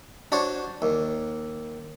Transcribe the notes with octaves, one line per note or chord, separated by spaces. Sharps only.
D4 F#4 C5 C#5
D#2